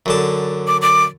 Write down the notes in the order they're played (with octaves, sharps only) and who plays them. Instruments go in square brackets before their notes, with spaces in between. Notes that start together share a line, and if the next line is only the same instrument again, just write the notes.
[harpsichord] F#2 D3 A5
[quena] D6
D6